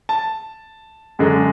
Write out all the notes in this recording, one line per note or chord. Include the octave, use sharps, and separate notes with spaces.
A5
F#2 D3 G#3